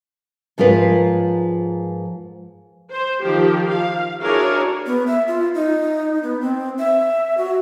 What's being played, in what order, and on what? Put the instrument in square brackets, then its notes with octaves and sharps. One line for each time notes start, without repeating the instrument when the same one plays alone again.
[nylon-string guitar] G#2 F3 F4 A#4 B4 C#5
[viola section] C5
D#3 F3 G4
F5
D4 E4 F#4 G#4 A#4 C#5
[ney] B3
E5
F4
D#4
B3
C4
E5
F#4